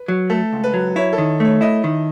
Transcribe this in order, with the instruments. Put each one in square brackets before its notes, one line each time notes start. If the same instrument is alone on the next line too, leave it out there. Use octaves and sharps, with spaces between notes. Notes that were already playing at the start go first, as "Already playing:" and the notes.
Already playing: [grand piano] B4
[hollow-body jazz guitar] F#3
[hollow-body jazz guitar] A3 [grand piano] A4
[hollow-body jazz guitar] C#2
[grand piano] B4
[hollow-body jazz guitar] F#3
[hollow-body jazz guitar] E4 [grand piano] C#5
[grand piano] A4
[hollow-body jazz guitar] D#3
[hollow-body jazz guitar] A3 [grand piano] C#5
[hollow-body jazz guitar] E4 [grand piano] D#5
[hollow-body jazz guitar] D#3